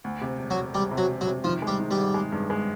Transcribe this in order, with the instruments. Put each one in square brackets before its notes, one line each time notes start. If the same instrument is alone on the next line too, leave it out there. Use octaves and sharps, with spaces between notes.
[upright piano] D2
C3
E1
[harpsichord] F#3 F#4
[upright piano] E1
[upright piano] E1 [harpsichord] G3 G4
[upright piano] C3
[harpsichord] F#3 F#4
[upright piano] E1
[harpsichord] F#3 F#4
[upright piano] C3
[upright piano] D#3 [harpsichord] F3 F4
[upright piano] G#3
[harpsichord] G3 G4
[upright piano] D#3
[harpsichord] G3 G4
[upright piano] G#1
G#3
G2
G#3